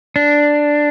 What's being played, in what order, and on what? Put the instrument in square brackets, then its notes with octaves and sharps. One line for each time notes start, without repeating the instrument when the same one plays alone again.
[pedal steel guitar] D4